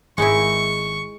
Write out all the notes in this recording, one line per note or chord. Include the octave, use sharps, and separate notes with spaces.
G#1 G#3 D#4 E4 C#6